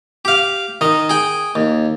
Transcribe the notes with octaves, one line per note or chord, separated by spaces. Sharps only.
G4 F5
D#3 D#5
G#4 G5
D#2